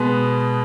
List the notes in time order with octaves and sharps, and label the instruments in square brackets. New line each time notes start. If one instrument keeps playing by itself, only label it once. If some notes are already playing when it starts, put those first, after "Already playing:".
Already playing: [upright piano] B2 G#3 B3